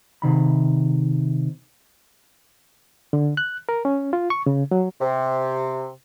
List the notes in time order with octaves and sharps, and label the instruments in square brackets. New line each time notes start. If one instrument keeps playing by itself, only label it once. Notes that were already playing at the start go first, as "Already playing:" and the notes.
[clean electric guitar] C3 D#3 B5
[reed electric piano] D3
F#6
A#4
C#4
F4
C#6
C#3
F#3
[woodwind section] C3